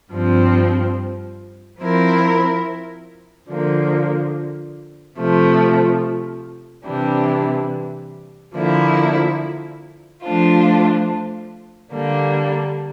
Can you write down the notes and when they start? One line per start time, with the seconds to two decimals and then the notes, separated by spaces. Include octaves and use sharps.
0.11 G2 F3 C4
1.79 F3 C4 E4 A#4
3.48 D3 F3 A#3
5.17 C3 F3 A3
6.85 C3 E3 G3 D4
8.54 D3 F3 A#3 E4
10.23 F3 A3 D4 F4 C5
11.92 D3 G3 A#3 D4